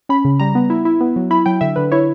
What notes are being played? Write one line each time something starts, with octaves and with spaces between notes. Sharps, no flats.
C#4 B5
C#3
G3 A#5
B3
E4
E4
B3
F#3
E4 B5
F#3 G5
D3 E5
D3 B4
E4 C#5